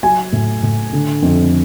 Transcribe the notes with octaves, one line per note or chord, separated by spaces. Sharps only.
F#3 G#5
A2
A2
D3
F2